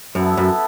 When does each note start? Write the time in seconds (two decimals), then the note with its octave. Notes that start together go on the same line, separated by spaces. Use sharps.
0.15 F#2 B3 E4 A4 E5
0.37 F#2